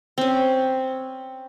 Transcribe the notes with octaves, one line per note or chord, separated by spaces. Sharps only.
C4 C#4